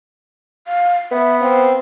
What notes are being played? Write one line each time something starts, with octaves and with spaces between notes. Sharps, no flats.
F5
B3 E5
C4 F5